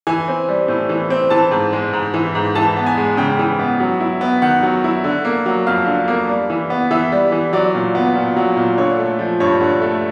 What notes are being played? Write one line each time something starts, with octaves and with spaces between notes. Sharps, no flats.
E3 G#5
C4
G3
A2
E3
C4
E3 A5
G#2
G#3
G#2
E3
G#2
E3 A5
B3
G#5
G#3
C#3 G5
E3
B3
F#3
E4
B3
D#3 F#5
F#3
E4
D3
A#3
F#3
F2 F5
D3
A#3
G3
E3
B3
E3 E5
G3
E3
F#3 D5
A#2
B3
A#2
F#3
A#2
D3 C#5
A3
F3
G2 C#5
D3
A3